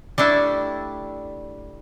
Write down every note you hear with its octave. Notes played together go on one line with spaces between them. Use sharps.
G3 A3 D4 E4